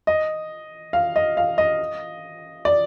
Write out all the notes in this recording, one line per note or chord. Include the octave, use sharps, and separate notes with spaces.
D#5
F5
D#5
F5
D#5
D5